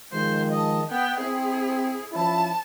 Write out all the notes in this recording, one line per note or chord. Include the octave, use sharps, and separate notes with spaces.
D#3 F3 G#3 C5
D#5 A5
B3 G5
C4 E4 G#4
F3 C#4 E4 A5